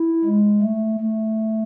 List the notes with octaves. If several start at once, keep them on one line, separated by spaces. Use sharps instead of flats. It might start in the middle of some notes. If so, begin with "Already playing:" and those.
Already playing: E4
G#3
A3
A3